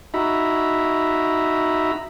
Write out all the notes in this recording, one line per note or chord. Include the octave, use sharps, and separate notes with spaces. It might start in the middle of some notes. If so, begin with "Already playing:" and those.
D#4 F#4 E5 A#5 B5